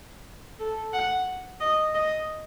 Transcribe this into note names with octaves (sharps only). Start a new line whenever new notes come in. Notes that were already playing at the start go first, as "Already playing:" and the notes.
A4
F#5
D#5
D#5